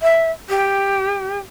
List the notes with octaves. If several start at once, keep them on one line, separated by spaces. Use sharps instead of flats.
E5
G4